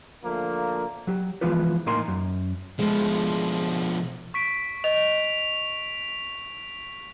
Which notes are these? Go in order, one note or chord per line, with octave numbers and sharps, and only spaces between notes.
D3 F3 A3 A#3
F#3 G4
E3 F3 G#3 B3 F4 B4
A2 A#3 D#4 A#4 G#5 C6
F#2
B2 F3 G#3 A3
C#6 B6 D7
D#5 F7